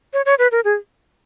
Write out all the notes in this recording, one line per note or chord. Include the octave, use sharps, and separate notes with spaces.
C#5
C#5
B4
A#4
G#4